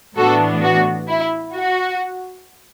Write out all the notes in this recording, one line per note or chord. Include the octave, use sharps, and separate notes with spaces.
A2 E3 B3 D4 F#4 A4
F#4
E4
F#4